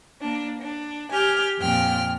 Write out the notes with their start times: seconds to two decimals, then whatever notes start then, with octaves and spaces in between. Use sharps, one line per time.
0.21 A#3 D4
0.61 D4
1.11 G4 G#5 F6 G6
1.59 F2 A#2 G5 F6